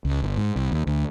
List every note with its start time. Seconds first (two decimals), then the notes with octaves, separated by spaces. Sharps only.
0.05 C#2
0.22 G1
0.37 G#2
0.56 C2
0.72 D#2
0.87 D2